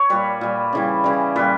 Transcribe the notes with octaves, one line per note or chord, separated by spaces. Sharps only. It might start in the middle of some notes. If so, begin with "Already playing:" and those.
Already playing: C#5
A#2 G3 B4
A#2 G3
C#3 E3 G3
C#3 E3 G3
A#2 G3 B4